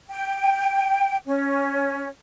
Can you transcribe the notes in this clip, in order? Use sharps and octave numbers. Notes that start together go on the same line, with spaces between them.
G5
C#4